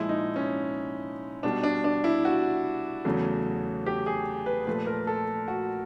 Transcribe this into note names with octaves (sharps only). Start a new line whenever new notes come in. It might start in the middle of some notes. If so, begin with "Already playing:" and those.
Already playing: A#2 F3 G#3 E4
D#4
C#4
B2 G3 D4
D4
D4
E4
F#4
E2 C#3 F#3 A3
G4
G#4
B4
A#2 F3 A3 B4
A#4
A4
F#4